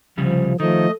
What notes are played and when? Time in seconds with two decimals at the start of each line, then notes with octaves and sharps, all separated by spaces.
0.17 C2 C#3 F3 G3
0.60 D#3 F3 A3 D#5